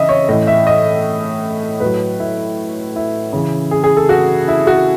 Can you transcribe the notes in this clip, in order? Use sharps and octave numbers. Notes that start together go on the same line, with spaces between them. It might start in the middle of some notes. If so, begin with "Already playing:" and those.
Already playing: C#3 E3 D#5 E5
C#5
A2 E3 D#5
E5
D#5
A2 F#3 B4
E4
E4
C#3 E3
G#4
G#4
A4
F#4
E4
F#4